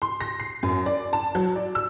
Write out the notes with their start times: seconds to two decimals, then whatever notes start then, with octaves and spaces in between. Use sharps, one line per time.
0.02 C6
0.20 A#6
0.40 C7
0.63 F#2
0.86 D5
1.13 A5
1.35 F#3
1.56 D5
1.75 E6